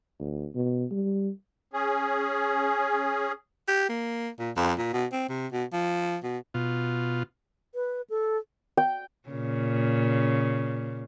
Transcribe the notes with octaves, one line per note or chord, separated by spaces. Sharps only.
D2
B2
G3
C#4 G#4
G4
A#3
A#2
F2
A#2
B2
C4
C3
B2
F3
B2
B2 F4
B4
A4
G5
A#2 C#3